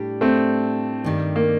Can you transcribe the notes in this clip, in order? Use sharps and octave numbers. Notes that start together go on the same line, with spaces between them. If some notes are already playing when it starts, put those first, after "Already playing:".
Already playing: A2 G3 D4 G4
A3 C4
G2 D#3 G3
A#3